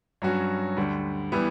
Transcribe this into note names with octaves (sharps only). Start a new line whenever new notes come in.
G2 F#3 C#4 F#4
D2 D3 G3
E3 G3 B3 E4